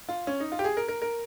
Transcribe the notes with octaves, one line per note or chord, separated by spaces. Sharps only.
F4
C#4
D#4
F4
G4
G#4
A#4
A#4
A#4